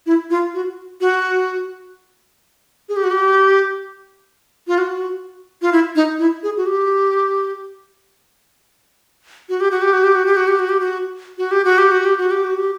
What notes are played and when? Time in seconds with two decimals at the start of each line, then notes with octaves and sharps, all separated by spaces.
0.06 E4
0.30 F4
0.54 F#4
1.01 F#4
2.89 G#4
2.96 G4
3.04 F#4
3.11 G4
4.68 F4
4.78 F#4
5.62 F4
5.72 E4
5.96 D#4
6.19 E4
6.43 G#4
6.57 F#4
6.66 G4
9.49 F#4
9.60 G4
9.71 F#4
9.82 G4
9.93 F#4
10.04 G4
10.15 F#4
10.26 G4
10.37 F#4
10.47 G4
10.59 F#4
10.69 G4
10.80 F#4
11.38 F#4
11.51 G4
11.65 F#4
11.78 G4
11.91 F#4
12.05 G4
12.18 F#4
12.31 G4
12.44 F#4
12.57 G4